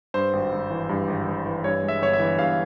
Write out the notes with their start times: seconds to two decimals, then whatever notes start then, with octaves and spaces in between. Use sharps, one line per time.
0.14 G2 C5
0.33 G#1
0.52 G#1
0.70 E3
0.89 G2
1.08 G#1
1.27 G#1
1.46 E3
1.64 G2 C#5
1.83 G#3
1.88 E5
2.02 G1 C#5
2.13 E5
2.19 E3
2.39 G2 F5